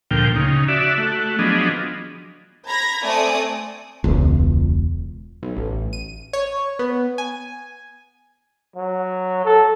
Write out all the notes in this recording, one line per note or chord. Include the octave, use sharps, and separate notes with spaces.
D2 A#2 F3 G5
C#3 D#4
F#4 D5 E5
A3 F#4
F3 F#3 B3 D4 G#4 D#5
A#5 B5 G#6 A#6
A3 C4 A4 D5 G#5 D#6
E1 C#2
B1
A1
D#7
C#5
B3
G#5
F#3
A4